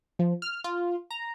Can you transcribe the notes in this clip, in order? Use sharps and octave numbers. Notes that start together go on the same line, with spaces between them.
F3
F6
F4
A#5